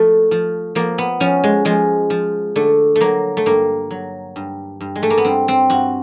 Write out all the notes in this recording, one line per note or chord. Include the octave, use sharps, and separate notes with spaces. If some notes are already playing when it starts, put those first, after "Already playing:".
Already playing: F3 A3
F3
F3 A#3
B3
F3 C#4
G#3
F3 G#3
F3
D3 A3
A3
F#3 A#3
A3
G2 A#3
F#3
G2
G2
G#3
A3
A#3
B3
G2 C4
C4
G2 F#4